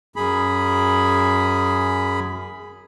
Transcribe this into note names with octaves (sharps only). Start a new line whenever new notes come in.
F#2 G#4 B5